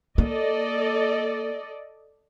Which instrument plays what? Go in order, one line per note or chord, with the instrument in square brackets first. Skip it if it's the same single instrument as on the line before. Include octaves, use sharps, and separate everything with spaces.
[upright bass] A#3 [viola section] A4 D5 D#5